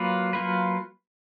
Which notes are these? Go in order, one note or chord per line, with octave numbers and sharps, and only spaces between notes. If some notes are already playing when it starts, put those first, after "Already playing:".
Already playing: F#3 A#3 F4 B4
F#3 A#3 F4 B4